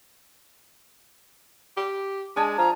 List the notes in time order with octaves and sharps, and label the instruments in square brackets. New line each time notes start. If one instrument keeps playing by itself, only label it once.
[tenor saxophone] G4
[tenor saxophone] G#3 [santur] D4 G#5 A5
[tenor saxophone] F3 [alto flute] A#5